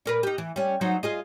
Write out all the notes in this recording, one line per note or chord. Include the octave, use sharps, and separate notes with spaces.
A#2 A#4 B4
D#4 G4
E3
G3 C#4
F#3 D#4 C5
F4 G#4 D#5